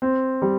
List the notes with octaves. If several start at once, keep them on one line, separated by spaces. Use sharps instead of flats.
C4
G3